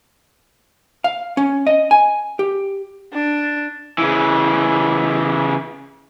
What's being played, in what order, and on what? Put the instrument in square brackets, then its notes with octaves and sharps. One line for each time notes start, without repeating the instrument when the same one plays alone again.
[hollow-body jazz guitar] F5
C#4
D#5
G#5
G4
[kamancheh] D4
[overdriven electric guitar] C#3 E3